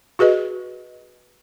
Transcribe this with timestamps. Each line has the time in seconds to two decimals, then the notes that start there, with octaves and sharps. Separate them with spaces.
0.19 F#4 G#4 B4 D#5